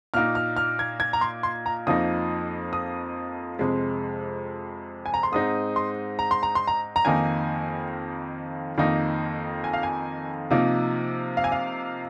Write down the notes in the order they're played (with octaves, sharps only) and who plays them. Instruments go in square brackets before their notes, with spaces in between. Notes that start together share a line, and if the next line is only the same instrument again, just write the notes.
[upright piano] A#2 A#3 D#4 F6
F6
F6
G#6
G#6
A#5
C6
C6
A#5
F2 F3 A#3 D#4 D#6
D#6
F2 C3 G#3
G#5
A#5
C6
G#2 G#3 C4 D#4 D#6
C6
A#5
C6
A#5
C6
A#5
A#5
F2 D#3 A#3 D#4 G#5
F2 D#3 A#3 D#4
G#5
F5
G#5
C3 F3 A#3 D#4
F5
G#5
F5